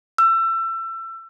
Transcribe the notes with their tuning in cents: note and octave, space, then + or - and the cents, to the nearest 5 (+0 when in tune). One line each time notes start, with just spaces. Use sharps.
E6 +30